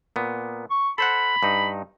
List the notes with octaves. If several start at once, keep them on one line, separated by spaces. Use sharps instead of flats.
A#2 B3
C#6
A4 C5 F#5 B5
G2 D#4